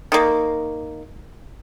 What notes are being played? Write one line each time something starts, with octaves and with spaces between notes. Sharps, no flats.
D#3 A#3